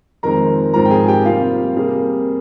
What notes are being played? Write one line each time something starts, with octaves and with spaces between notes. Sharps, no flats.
F2 D#3 G#3 C4 A#4 A#5
G#2 F3 C4 A#4 A#5
G5
G#4 G#5
G4 G5
C3 G3 A#3 F4 F5
C3 G3 A#3 G#4